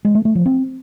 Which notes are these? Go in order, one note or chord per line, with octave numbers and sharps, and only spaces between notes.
G#3
A3
A3
F3
C4